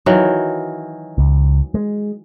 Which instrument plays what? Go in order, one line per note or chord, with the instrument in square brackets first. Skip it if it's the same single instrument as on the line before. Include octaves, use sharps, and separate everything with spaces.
[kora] D#3 E3 F#3
[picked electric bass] C#2
G#3